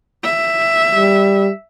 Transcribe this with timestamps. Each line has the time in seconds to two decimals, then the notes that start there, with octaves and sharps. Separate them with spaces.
0.24 E5
0.95 G3